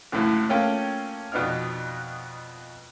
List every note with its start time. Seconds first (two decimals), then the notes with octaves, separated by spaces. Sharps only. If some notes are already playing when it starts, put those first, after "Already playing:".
0.12 C#2 F#2 A2 E3
0.49 A3 A#3 C#4 F4 G5
1.32 F2 B2 B3 D#4 D5 F6